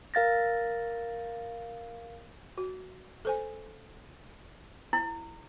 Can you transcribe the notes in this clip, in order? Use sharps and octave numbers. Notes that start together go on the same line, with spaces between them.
A#4 F5 A6 A#6
F#4
A4 C5 G#5
E4